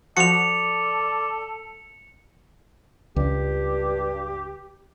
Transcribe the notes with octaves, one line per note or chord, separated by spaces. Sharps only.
F3 F#4 A4 D5 C#7 F7
C#2 G2 G4